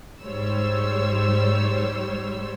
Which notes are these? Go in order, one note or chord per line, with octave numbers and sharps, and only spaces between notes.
G#2 G3 C5 C#5 E6